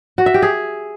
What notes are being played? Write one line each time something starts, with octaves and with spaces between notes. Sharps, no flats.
F#4
E5
G4
G#4